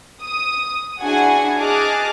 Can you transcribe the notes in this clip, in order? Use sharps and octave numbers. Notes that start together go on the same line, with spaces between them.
D#6
D4 E4 F#4 G#4 F#5 G#5
G#4 D#5 A5 D6 F6 F#6